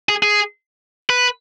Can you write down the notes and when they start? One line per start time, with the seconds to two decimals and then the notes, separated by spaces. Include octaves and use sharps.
0.09 G#4
0.22 G#4
1.10 B4